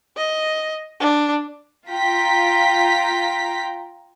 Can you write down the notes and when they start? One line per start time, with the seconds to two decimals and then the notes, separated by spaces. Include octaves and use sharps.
0.17 D#5
1.00 D4
1.89 F4 G5 A#5 B6